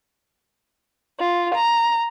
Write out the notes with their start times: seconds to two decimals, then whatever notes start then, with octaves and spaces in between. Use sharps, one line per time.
1.19 F4
1.54 A#5